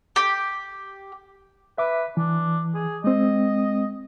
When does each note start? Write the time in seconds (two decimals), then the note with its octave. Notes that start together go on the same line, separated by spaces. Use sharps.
0.16 G4
1.78 B4 E5 D6
2.17 E3 D4
2.75 G#4
3.04 G#3 C4 D#5